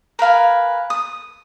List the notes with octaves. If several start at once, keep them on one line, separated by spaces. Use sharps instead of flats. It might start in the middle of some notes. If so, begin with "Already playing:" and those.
A#4 B4 F5 G#5
D#6